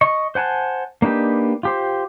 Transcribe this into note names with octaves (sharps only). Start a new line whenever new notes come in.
D#5 C#6
C5 F#5 G#5 A5
A#3 D4 D#4 G4 B4
F4 G4 C5